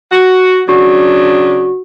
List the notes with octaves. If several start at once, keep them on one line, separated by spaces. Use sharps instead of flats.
F#4
C#3 F#3 D4 F#4